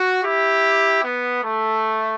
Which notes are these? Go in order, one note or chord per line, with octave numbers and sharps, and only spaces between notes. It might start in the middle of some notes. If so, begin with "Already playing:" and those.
Already playing: F#4
E4 G4
B3
A3